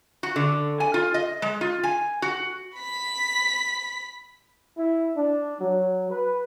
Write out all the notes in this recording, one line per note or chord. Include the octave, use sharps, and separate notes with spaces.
F#4
D3
G#5
F4
D#5
G#3
F4
G#5
F#4
B5 B6
E4
D4
F#3
B4